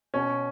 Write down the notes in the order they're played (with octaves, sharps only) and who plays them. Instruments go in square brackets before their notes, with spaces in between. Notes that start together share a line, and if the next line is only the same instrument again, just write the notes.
[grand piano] B2 C#4